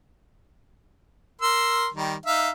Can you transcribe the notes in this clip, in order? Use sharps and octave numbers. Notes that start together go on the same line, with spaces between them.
A#4 C6 E6
D#3 G3
D#4 E5 F5